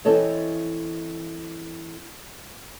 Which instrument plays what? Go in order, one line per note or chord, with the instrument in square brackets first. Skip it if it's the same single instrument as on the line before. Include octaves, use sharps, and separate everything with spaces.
[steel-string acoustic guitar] E3 C4 E4 A4 C#5 D#5